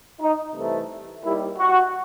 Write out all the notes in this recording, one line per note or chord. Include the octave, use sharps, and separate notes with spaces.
D#4
C2 C3 E3 A3
D#2 D#3 G3 E4
F#4